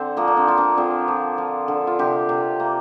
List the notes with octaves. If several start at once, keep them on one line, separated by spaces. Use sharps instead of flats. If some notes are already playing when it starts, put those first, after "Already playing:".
Already playing: D3 C4
F3 A#3
D4
C4
F3 F4
A#3 D4
D3 C4 F4
F3
F3
D3
F4
C3 D4 G4
C3
A#3